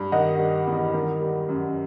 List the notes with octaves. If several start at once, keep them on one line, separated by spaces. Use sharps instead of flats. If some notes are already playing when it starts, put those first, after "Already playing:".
Already playing: G2
D#3 D#5 F#5
G3
E2
D#3
G3
F#2